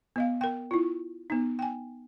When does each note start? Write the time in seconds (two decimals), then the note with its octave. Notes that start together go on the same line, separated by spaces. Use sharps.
0.16 B3 D#5 F5
0.41 A#4 G5
0.71 E4 F4
1.30 B3 D#4
1.59 G5 G#5